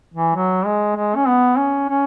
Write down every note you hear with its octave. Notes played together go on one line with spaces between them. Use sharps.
E3
F#3
G#3
G#3
C#4
B3
C#4
C#4